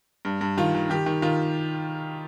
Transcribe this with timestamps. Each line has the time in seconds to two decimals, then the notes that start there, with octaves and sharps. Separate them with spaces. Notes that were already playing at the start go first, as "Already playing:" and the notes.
0.25 G2
0.41 G2
0.57 D#3 F4
0.75 D#3
0.90 D#3 G4
1.06 D#3
1.22 D#3 F4